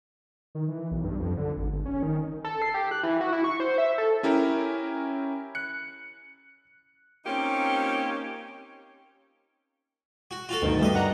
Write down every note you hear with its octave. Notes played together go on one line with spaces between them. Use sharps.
D#3
E3
B1
G2
F2
D3
G#1
G1
C#4
D#3
A4
C7
G4
F#6
E3
F#4
E4
C#6
C5
E5
A4
C#4 E4 G4 A#4
F#6 C#7
A#3 C4 C#4 D#4 F4 G4
F#4
F4 F#4 A4
D2 G2 B2 D#3
G2 G3 A3 D#5
D4 F#5 A#5